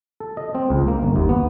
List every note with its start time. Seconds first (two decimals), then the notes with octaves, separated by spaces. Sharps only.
0.20 A4
0.37 D#5
0.55 C4
0.70 C#2
0.88 A#3
1.03 G1
1.16 D#2
1.29 B3